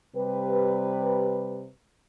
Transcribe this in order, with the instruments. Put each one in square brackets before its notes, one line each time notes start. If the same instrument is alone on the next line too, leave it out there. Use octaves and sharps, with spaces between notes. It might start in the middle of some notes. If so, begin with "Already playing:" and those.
[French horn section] C3 G3 G4 B4